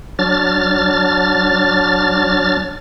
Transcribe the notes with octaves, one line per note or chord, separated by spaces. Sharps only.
F#3 D4 F6 A6